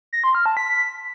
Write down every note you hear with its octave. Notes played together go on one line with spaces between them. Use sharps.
A#6
C6
F6
A5
B6